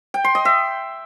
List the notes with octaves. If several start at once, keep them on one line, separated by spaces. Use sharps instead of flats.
G5
C6
D#5
E5